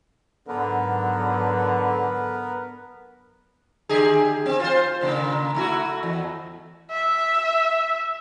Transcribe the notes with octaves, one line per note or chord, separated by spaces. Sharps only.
G#2 D3 F#3 B3 A#4 B4
D3 G4 G#4
C4
F4 C5
A#2 C#3 A#3
A3 E4 F#4
E2
E5